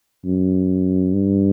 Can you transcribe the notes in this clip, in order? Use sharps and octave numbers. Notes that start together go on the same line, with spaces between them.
F#2
G2